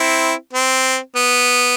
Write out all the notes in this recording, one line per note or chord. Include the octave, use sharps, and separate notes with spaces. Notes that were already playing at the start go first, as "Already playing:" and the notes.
Already playing: C4 E4
C4
B3